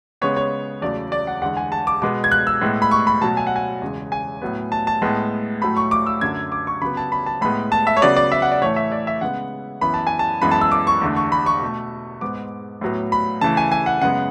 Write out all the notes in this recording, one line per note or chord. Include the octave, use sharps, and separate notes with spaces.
C#3 G#3 B3 C#5
C#5
E2 C#3 F#3 A3 D5
D5
F#5
E2 D3 G#3 F#5
G#5
A5
D6
B2 G#3 B3 D6
G#6
F#6
E6
A2 G#3 B3
B5
C#6
B5
B2 F#3 A3 A5
G#5
F#5
G#5
E2 C#3 G#3
G#5
A2 F#3 B3
A5
A5
A2 G#3 B3
A2 F#3 A3 B5
C#6
D6
E6
F#2 D3 F#3 A3 G#6
D6
C#6
C#3 F#3 B3 B5
A5
B5
A5
A2 G#3 B3 B5
A5
E5
C#5
C#3 F#3 B3 D5
D5
E5
F#5
D5
A2 E3 A3 C#5
E5
D5
E5
C#3 G#3 B3 F#5
F#2 E3 B3 B5
A5
G#5
A5
F#2 E3 G#3 B3 B5
A5
E6
D6
C#6
E2 D3 A3
C#6
B5
C#6
B2 A3
G#2 G#3 B3 D6
A2 F#3 B3
B5
C#3 E3 A3 A5
G#5
G#5
F#5
F#2 C#3 G#3 B3 F#5